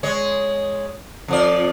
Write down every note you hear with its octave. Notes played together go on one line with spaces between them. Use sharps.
G#3 C#5
F2 F3 D5